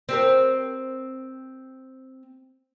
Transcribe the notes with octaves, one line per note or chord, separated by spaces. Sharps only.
C4 G4 A#4